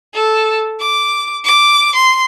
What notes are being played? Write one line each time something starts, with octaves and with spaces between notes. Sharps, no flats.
A4
D6
D6
C6